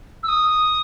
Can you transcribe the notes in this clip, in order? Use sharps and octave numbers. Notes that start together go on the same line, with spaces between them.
E6
D#6